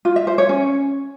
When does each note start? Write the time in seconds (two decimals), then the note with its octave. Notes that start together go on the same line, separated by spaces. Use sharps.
0.05 F4
0.16 E5
0.27 C5
0.38 C#5
0.49 C#4